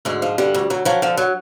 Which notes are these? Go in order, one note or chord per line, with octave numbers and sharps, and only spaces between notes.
D2 G#2 G#3
F3
G2 D3 G3
D2
D2 F#3
F3 F#3
D3 F3
F#3